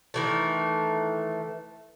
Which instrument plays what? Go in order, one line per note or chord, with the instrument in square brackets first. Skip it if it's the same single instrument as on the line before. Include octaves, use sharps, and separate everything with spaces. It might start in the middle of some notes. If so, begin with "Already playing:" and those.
[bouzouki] D#3 E3 A3